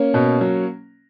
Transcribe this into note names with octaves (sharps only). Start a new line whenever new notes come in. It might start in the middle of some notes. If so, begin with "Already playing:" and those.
Already playing: A#3 C#4
B2
F#3